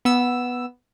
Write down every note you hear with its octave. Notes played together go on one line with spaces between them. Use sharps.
B3 E6